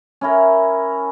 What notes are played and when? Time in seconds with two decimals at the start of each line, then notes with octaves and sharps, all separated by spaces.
0.21 C#4 E4 A#4